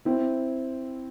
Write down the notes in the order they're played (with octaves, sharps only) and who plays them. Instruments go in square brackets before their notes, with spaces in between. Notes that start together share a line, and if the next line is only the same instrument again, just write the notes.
[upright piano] C4 E4